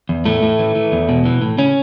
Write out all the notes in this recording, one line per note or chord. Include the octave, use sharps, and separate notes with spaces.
E2
A2 A3
A2
E3
E3
E2
B2
E3
A2
C#3 C#4